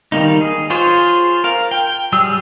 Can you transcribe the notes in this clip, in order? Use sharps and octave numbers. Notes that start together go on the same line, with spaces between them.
D#3 G3 A#3 D#4
G#4
F4 G#4 C5 C#5
A#4 F5
G5
F#3 G3 G#4 E6